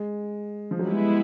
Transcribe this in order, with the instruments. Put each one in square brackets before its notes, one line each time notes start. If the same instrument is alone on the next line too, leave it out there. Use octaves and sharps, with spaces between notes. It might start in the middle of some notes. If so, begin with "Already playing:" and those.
Already playing: [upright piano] G#3
F3
F#3
[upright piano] G3 [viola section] G#3 B3 E4